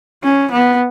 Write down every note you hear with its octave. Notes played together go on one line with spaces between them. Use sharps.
C#4
B3